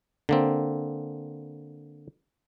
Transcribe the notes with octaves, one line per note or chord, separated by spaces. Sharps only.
D3 A#3 C4